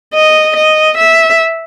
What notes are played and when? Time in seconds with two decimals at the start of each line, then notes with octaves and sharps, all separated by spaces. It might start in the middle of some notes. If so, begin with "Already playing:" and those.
0.14 D#5
0.56 D#5
0.97 E5